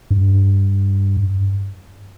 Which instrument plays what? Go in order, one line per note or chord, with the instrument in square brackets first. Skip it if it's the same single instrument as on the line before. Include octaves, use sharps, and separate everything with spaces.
[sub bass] G2